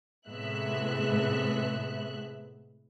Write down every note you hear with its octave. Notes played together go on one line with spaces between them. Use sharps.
A2 C3 G#3 B3 E5 F#6